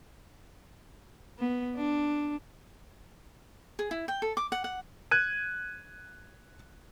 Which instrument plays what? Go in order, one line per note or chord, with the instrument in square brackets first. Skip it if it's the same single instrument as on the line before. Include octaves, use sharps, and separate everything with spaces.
[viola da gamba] B3
D4
[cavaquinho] G#4
E4
G5
A4
D6
F#5
F#5
[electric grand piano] F#6 G#6 D#7